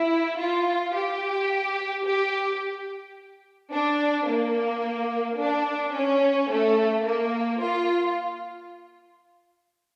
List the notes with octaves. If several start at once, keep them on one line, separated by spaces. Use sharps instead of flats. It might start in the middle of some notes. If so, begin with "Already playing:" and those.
Already playing: E4
F4
G4
G4
D4
A#3
D4
C#4
A3
A#3
F4